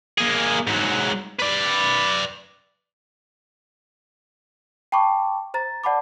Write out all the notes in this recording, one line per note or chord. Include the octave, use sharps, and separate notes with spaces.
A#3 G#4
G#2 F#3
B4 D5
G5 A5 B5 C#6 D6
C5 A#5 A6
D5 F#5 A5 B5 D6